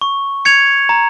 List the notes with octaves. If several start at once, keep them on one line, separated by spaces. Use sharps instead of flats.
C#6
G#6 C#7 F7
A#5